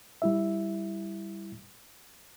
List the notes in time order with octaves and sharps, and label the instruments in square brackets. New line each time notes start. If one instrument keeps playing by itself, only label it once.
[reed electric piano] G3 E4 E5